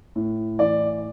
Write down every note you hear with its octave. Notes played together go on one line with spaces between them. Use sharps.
A2
E3 D5